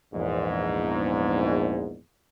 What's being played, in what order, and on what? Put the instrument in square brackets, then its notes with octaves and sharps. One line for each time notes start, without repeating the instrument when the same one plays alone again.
[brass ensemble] A#1 E2 G#2